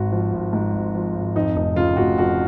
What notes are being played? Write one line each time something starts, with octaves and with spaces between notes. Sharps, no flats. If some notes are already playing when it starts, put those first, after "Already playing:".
Already playing: G#1 G#2 F#4
F3
G#1
G#2
G#1
F3
G#1
F2 D#4
F1 D#4
C#3 F4
F1 F#4
F2 F#4